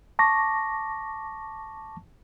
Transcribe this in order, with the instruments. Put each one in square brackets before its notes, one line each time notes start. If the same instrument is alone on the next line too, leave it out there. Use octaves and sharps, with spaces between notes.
[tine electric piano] A5 C#6 D6 A#6